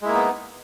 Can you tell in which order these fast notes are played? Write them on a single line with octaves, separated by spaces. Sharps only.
G#3 E4 A#3 D#4 B3